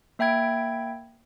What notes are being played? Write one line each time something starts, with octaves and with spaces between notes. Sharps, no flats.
A#3 E5 G5 B5 G#6 D7